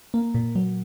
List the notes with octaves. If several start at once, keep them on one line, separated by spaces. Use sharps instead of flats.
A#3
A#2
F#3